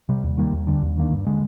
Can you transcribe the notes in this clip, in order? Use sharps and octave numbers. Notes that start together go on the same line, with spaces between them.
C3 G3
D#2
D#3 G3 A#3
D#2
D3 G3 D4
D#2
D#3 A#3 D4
G2
D3 G#3